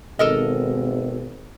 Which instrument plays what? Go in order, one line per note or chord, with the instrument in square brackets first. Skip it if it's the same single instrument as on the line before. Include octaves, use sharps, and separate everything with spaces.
[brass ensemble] G#1 [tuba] B2 [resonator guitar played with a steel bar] A4 A#4 D#5